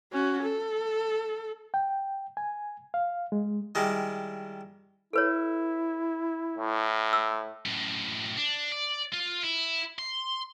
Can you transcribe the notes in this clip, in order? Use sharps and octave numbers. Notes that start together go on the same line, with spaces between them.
C#4 F#4
A4
G5
G#5
F5
G#3
D#3 G3 G#3 E4
E4 A4 B4 C#5
A2
E6
F#2 A2
D4
D5
F4
E4
C6